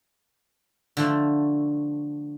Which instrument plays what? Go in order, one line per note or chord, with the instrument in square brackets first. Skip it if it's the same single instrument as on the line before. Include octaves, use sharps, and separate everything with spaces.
[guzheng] D3 F3 A3